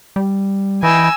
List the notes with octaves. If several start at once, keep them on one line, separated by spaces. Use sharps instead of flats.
G3
E3 E4 D#5 G5 G#5 E6